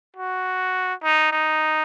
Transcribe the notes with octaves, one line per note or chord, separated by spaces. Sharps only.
F#4
D#4
D#4